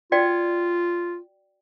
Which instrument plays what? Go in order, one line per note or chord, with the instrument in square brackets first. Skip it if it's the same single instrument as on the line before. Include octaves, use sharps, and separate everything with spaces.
[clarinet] F4 [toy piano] F#4 D5 G5